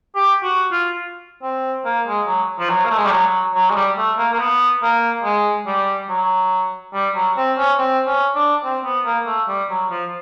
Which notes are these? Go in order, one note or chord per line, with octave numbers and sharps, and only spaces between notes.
G4
F#4
F4
C4
A#3
G#3
F#3
F3
F#3
A#3
A3
G#3
G3
F#3
F#3
G#3
G3
A3
A#3
A#3
B3
A#3
G#3
G3
F#3
G3
F#3
C4
C#4
C4
C#4
D4
C4
B3
A#3
A3
G3
F#3
F3